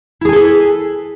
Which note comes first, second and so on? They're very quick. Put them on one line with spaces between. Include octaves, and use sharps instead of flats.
E4 G#4 G#5 A4 B4